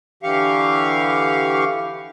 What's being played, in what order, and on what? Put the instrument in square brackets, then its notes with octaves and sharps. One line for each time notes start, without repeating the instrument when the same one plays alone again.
[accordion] D3 E3 G4 F5 C#6